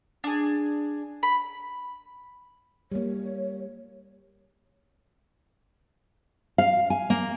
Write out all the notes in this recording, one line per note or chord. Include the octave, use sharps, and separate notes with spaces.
D4 G#4
B5
G3 A#3 C#5
F5
G#5
A#3